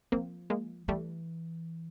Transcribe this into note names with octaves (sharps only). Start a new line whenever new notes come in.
F3 A#3 C4
G#3 A#3
E3 G3 A3